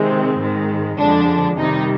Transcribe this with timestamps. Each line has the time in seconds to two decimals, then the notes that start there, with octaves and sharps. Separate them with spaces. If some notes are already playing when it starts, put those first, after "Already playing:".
Already playing: C3 D#3 G#3 C4
0.40 G#2 D#3 G#3
0.99 F2 D3 F3 G#3 D4
1.58 C3 D#3 G3 D#4